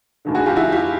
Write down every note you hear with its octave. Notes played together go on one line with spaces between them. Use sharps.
F1 D#2 D3
F#4 G#4
F4 G4
E4 F#4
F4 G4